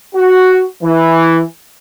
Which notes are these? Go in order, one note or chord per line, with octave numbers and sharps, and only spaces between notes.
F#4
E3